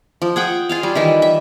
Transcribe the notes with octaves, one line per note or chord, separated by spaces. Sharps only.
F3
G#4 F#5 G5
F4 G#4 F5
G3
D#3 E3 E4
E5